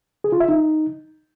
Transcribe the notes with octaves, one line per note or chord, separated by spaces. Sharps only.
G#4
F4
E5
D#4